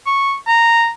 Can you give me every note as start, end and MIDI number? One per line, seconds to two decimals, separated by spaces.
0.07 0.35 85
0.47 0.89 82